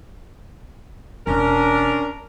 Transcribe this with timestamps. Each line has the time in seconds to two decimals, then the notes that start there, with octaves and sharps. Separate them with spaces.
1.27 E1 C#4 D4 A#4